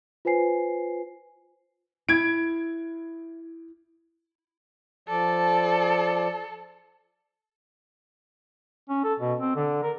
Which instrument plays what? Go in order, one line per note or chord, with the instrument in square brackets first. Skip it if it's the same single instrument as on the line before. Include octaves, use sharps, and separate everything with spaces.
[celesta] F4 B4 C5 G#5 C7
[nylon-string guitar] E4 [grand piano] G#6 D7
[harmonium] F3 D5 [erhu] A4
[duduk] C#4
A4
B2
C4
D3
A#4